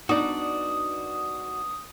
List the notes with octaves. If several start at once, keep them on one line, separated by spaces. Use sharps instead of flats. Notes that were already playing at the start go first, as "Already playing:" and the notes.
B3 D4 D#4 F#4 D5 D#6